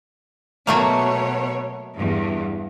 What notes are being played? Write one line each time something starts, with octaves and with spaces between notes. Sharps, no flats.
B2 F#3 A3 A#3 C#5
E2 G2